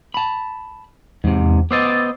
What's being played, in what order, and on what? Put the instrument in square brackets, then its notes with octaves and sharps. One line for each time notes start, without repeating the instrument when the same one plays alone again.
[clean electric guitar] A5 B5
[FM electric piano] E2 [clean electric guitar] G#2 C3
[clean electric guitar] B3 C5 D#5 [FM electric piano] D6 E6 A6